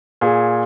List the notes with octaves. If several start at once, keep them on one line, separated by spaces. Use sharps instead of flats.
A#2 G#4